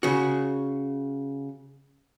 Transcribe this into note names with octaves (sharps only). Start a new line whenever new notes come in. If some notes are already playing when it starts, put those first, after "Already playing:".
C#3 F#4